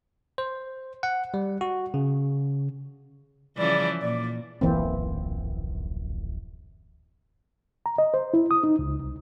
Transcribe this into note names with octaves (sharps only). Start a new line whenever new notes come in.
C5
F#5
G3
F#4
C#3
C#3 E3 F3 G3 C#4 D5
A#2 D5
D1 A#1 F#2 E3 A#3 C4
A#5
D#5
C5
E4
D#6
D#4
C#2
C2